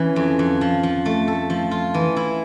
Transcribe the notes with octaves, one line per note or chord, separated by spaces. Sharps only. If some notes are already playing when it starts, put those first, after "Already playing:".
Already playing: E3 C#4
F2
F2
F3
F3
A3
A4
F3
F4
E3
E4